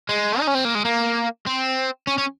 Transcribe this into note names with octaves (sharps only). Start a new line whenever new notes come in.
G#3
D#4
C#4
C4
A#3
G#3
A#3
C4
C#4
C#4